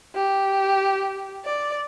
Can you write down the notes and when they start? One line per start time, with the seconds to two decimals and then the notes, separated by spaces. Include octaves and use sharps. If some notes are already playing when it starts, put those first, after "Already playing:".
0.15 G4
1.45 D5